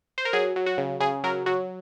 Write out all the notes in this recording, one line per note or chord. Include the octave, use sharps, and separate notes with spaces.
C5
A#4
F#3 G#4
F#3
F#4
C#3
C#3 G#4
F#3 A#4
F#3 F#4